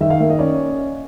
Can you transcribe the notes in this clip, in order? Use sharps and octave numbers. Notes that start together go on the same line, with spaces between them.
D#3 E5
F5
A#3 E5
D#5
C#4 D5